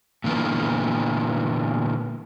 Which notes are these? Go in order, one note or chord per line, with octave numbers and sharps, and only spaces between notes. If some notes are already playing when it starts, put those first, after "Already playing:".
A#2 D3 E3 A#3 B3